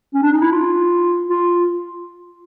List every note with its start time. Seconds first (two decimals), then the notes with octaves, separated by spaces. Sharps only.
0.14 C#4
0.23 D4
0.32 D#4
0.42 E4
0.52 F4
1.29 F4